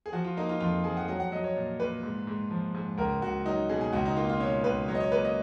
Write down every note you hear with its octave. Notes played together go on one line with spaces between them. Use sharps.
G#4
F3 F#4
F4
A#3 D#4
F4
F2 F4
F3 G#4
F#5
F#3 F#5
F#5
F#3 D#5
C#5
A#2
A#2 B4
G#2
G#2
F3
G#2
C#2 A#4
C#2 F#4
F#3 D#4
B2 G#4
G#4
C#2 F#4
D#4
A#3 F4
F4
B2 C#5
C#2 B4
F#3 C#5
D#5
C#5
A#3 B4
D#5